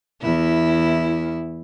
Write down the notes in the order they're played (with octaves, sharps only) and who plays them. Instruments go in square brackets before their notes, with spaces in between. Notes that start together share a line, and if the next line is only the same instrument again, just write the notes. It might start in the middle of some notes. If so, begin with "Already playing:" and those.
[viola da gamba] E2 E4